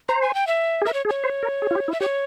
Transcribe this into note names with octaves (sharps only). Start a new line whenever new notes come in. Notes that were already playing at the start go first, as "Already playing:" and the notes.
C5 A#5
G#5
G5
E5
G#4
A#4 E5
C#5
G#4
C#5
C5
A#4
G#4
F4
G4
E4
E5
G4 C#5